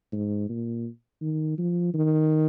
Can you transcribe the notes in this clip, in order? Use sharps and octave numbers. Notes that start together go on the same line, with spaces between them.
G#2
A#2
D#3
F3
D#3